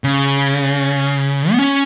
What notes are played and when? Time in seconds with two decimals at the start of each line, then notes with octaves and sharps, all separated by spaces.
0.04 C#3
1.52 B3
1.59 C#4